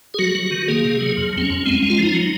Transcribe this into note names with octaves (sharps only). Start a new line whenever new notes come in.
G#4
F#3 F#4
F#3
D#3
A#3 G#4
C3
F#3
F2
F#3 C4
C#4
F2
G#3 C4
G#3 C#4
F4
F3 D#4
F#3